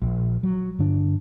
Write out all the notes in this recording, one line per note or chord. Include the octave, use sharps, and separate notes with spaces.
A#1
F#3
G2 D3 D4